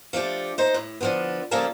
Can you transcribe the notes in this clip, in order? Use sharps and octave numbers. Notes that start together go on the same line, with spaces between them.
F3 A3 D4 G4
D#4 C5
A2
D3 F3 B3
C#3 F3 G3 A#3 C#4 A4